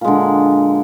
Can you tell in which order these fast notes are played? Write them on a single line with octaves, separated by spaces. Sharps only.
A#2 G#3 D3